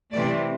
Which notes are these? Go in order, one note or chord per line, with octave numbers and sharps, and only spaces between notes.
C3 E3 A3 D5